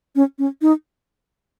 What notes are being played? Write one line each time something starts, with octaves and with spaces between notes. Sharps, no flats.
C#4
C#4
D#4